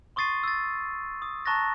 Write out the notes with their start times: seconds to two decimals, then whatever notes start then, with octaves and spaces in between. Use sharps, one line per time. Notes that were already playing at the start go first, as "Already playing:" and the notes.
0.16 C6 C#6 D#6 A6 C7 D#7
0.43 E6 A6
1.22 D#6
1.46 A5 A#5 C#6 F#6 A6 A#6